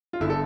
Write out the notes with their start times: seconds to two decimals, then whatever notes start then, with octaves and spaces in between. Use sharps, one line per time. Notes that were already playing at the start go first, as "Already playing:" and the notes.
0.13 F4
0.20 G1 D3 E4
0.30 A4